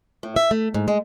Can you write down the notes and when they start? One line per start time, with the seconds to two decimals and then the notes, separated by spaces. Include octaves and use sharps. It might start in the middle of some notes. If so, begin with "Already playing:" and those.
0.23 A2
0.36 E5
0.51 A3
0.74 G#2
0.88 G#3